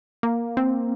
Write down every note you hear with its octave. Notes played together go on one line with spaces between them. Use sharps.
A#3
C4